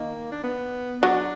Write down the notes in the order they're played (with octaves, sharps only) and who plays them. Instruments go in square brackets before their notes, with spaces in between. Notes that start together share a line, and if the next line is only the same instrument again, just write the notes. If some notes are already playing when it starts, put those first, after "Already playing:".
Already playing: [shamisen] D#3 [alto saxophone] A#3
[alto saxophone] D4
B3
[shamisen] F#3 [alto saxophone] D4